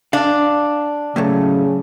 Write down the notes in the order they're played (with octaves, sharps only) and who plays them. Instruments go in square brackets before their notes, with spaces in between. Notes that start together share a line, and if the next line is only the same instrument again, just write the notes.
[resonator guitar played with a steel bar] D4 [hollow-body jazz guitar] D5 F5
[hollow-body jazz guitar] A2 F#3 A3 [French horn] C#3